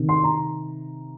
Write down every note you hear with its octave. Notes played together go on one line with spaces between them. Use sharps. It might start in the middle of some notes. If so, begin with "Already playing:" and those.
Already playing: C3 D#3
C6
A#5